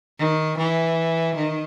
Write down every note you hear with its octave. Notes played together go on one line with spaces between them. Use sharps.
D#3
E3
D#3